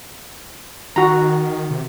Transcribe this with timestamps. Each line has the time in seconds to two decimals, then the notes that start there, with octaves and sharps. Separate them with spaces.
0.96 D#3 F#4 A#5
1.71 C3